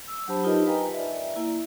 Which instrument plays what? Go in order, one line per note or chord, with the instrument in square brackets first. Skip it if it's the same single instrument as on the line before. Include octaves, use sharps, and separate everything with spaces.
[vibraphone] E6
F#3 D4 G4 C5 A5 B5
D#4 F4 G4 A#4 B4 D#5
B4 D#5 F5 G5 G#5 A#5
D5 E5
A#3 E4